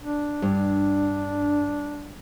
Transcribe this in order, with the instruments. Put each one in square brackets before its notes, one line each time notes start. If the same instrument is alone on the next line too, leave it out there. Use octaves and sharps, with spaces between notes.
[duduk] D4
[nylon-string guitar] G2